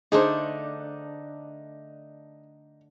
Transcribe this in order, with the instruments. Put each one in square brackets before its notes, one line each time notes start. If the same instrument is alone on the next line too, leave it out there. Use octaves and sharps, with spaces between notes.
[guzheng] D3 A3 D4 [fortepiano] D#4 [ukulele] G#4 C5